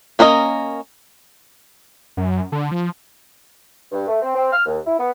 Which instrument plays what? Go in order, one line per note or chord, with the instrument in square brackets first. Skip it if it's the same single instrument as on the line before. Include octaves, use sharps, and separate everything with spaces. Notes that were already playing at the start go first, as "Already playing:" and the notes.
[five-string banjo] A#3 C#4 A#4 D#5
[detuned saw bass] F#2
D3
F3
[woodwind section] G2
A3
C4
C4
F6
D#2
E4
B3